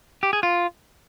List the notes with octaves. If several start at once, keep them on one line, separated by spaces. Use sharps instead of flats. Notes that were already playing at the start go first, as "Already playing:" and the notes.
G4
G#4
F4